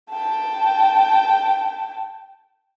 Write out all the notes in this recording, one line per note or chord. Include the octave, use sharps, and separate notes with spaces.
G5 A5